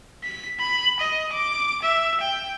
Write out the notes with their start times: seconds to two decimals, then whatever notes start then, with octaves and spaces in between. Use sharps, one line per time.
0.24 B6
0.60 B5
1.00 D#5
1.33 D6
1.83 E5
2.21 G5